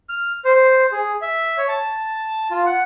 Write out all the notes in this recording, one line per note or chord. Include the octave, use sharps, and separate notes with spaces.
F6
C5
G#4
E5
C#5
A5
F4
F#5